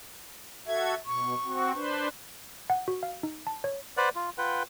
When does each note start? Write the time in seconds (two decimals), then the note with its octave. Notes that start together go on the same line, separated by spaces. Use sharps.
0.67 F#4 A4 E5 G#6
1.06 B2 C#6
1.44 C4 F#4
1.74 D4 B4 C5
2.70 F#5
2.88 F#4
3.03 F5
3.23 D#4
3.47 A5
3.64 C#5
3.97 B4 C5 D5 F#5
4.15 F4
4.38 F4 B4 F#5 G5